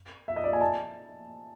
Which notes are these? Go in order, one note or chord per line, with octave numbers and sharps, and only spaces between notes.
E5
D#5
D5
G#5
A5